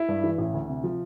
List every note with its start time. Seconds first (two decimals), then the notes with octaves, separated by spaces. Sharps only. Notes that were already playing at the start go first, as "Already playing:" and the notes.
Already playing: E4
0.08 G2
0.24 E3
0.38 A1
0.54 D2
0.69 C3
0.84 F3